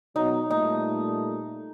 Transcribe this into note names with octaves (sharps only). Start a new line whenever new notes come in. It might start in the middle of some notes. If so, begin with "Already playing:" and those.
B2 F#3 D#4
A#2 G3 A3 D#4